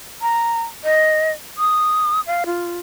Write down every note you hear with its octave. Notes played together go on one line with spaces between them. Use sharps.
A#5
D#5
D#6
F5
F4